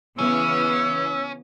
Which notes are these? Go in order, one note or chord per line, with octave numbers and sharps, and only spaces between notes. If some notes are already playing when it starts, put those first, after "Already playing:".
C#3 E3 B3 C#4 E6